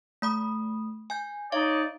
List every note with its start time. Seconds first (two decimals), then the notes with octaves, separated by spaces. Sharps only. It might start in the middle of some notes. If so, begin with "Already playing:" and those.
0.22 A3 B5 D#6
1.10 G#5 G6
1.52 D#4 C#5 D5 F5